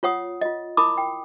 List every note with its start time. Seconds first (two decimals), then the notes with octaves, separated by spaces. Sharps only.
0.03 F4 C#5 F#5 D#6
0.41 F4 D#5
0.77 E4 A#4 A5 B5 D6 D#6
0.98 G5